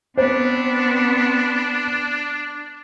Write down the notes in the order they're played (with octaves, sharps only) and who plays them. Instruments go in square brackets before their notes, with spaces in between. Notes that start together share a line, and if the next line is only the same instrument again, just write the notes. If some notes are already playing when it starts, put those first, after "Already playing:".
[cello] B3 C4 [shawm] D4 [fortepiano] C5